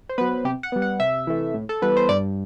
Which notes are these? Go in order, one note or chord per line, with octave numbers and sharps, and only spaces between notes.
C5
F#3 B3 B4
C3 G4
F#5
G3 B3
F#5
C3 E5
E3 A3
A2
A4
E3 G3 B3 B4
C5
G2 D5